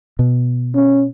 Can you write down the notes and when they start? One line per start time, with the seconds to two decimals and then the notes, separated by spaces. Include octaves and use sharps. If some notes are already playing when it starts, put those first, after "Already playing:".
0.19 B2
0.75 C#4